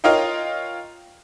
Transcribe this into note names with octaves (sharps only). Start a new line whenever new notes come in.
F4 A#4 C#5 D#5 F5 G5